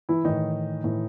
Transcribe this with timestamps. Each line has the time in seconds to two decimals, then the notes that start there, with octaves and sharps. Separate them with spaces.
0.09 E3 E4
0.24 A2 D#3 E3 D#4
0.84 A2 E3